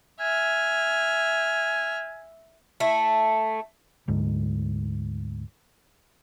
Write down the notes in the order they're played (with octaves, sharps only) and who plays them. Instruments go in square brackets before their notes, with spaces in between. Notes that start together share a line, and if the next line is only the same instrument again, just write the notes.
[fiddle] E5 F6 [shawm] G#5
[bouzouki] A3 E4
[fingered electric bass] D2 G#2